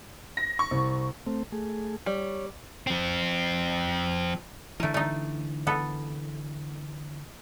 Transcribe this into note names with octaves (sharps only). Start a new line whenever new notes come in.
A#6
C#6
C2
A3 C4
A3 G#4
G3 C#5
F3 C4
D3 E3 A3 A#4
A3 D#4
B3 A4